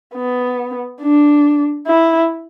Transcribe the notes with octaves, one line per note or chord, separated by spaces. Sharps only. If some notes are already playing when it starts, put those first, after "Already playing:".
B3
D4
E4